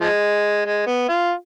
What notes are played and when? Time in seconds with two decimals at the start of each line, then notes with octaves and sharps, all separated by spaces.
0.01 F3 G#3
0.66 G#3
0.86 B3
1.08 F4